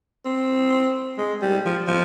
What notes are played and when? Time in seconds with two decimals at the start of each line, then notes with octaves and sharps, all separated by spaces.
0.25 C4
1.18 G#3
1.42 G3
1.66 F3
1.88 F3